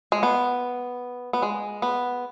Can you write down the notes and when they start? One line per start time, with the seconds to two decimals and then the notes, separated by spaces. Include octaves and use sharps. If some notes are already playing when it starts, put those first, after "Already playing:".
0.12 G#3
0.23 B3
1.33 B3
1.42 G#3
1.82 B3